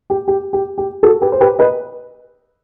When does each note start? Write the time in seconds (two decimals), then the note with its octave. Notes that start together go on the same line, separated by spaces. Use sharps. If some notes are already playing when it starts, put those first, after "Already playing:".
0.10 G4
0.28 G4
0.53 G4
0.78 G4
1.03 F#4 A4
1.22 G4 B4
1.32 C5
1.41 G4 B4
1.59 B4 D#5